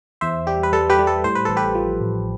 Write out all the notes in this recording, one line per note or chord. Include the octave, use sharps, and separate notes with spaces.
E2 C5 E5
G3 G4
B4
G3 A4
G4 B4
G3
A4
A2 C5
B4
A1 A4
G4 B4
F3
A1